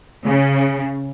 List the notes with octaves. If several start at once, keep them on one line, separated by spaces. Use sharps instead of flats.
C#3